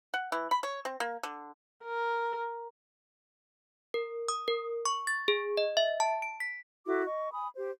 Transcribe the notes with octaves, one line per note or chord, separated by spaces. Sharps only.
F#5
E3
B5
C#5
C4
A#3
D3
A#4
A#4
D#6
A#4
C#6
A6
G#4
D#5
E5
A5
D7
B6
E4 F#4 A4 D6
D#5 C#6
G#5 B5 D#6
G4 C5